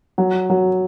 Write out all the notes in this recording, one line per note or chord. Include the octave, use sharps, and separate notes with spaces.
F#3
F#3